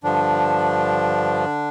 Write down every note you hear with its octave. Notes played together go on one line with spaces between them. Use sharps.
G2 D3 F3 D4